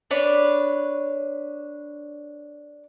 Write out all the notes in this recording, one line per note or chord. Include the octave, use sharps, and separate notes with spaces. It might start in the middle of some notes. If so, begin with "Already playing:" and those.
D4 B4 C#5